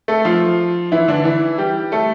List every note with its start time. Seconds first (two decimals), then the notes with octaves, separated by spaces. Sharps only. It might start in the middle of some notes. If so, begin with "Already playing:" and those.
0.08 A3 A4
0.25 F3 F4
0.92 E3 E4
1.08 D3 D4
1.25 E3 E4
1.58 G3 G4
1.92 A3 A4